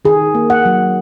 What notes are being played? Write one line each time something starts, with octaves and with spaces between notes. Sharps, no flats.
D#3 G#4
A#3
F#5
F#3